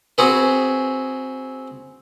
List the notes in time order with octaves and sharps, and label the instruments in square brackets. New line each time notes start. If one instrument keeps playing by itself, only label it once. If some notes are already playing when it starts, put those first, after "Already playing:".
[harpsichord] C4 F#4 G#4 B4